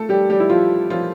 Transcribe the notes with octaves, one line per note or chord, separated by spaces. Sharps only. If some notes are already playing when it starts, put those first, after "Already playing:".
Already playing: A3 A4
G3 G4
G3 G4
E4
F3 F4
F3 F4